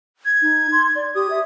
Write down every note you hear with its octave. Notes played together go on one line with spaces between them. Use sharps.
G#6
D#4
C6
D5
G4 D#6
E5